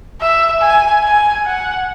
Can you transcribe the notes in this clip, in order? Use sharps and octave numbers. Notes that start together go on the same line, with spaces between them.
E5
G#5
G#5
F#5